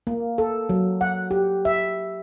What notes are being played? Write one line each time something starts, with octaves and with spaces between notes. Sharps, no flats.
A#3
A4
F#3
F#5
G4
E5